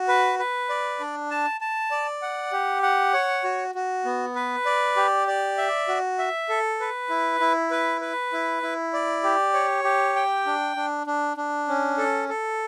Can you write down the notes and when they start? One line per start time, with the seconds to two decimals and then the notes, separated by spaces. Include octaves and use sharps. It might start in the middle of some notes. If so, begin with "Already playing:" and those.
Already playing: F#4
0.08 B4
0.39 B4
0.69 D5
1.00 D4
1.31 A5
1.61 A5
1.91 D5
2.22 F#5
2.52 G4
2.83 F#5
3.13 C#5
3.44 F#4
3.75 F#4
4.05 B3
4.35 B4
4.66 D5
4.96 G4
5.27 D5
5.58 E5
5.88 F#4
6.18 E5
6.49 A4
6.80 B4
7.10 E4
7.40 E4
7.71 B4
8.01 B4
8.33 E4
8.63 E4
8.93 D5
9.23 G4
9.54 C#5
9.84 G4
10.16 G5
10.46 D4
10.76 D4
11.07 D4
11.37 D4
11.68 C#4
11.98 A4
12.29 A4